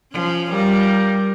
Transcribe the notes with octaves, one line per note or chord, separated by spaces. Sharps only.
F3 C#4
G3 F4 G4 A#4